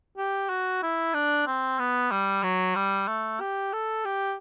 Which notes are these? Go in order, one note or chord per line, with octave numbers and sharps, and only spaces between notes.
G4
F#4
E4
D4
C4
B3
G3
F#3
G3
A3
G4
A4
G4